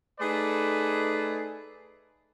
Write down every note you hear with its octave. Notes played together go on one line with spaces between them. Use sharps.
A3 D#4 G#4 A4 B4 D5